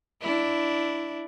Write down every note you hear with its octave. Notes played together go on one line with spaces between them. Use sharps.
D4 E4